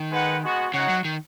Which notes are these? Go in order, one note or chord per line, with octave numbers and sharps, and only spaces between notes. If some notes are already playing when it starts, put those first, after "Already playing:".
Already playing: D#3
G#3 D#4 B4 F#5
G#3 B3 F#4
C#3 D#4 F#4 C#5 F#5
F#3
D#3